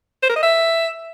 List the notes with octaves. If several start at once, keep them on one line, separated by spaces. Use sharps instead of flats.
C5
A#4
D#5
E5